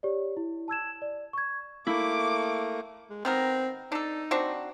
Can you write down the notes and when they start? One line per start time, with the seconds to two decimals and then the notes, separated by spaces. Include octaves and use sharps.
0.03 G4 C#5 D5
0.37 E4
0.68 A5 E6 G#6 E7
1.02 D5
1.33 C#6 G#6
1.87 A3 A#3 E4 D6
3.10 G#3
3.25 D#3 B3 C4 A#4
3.92 D4 D#4 A4
4.31 C4 D4 F#4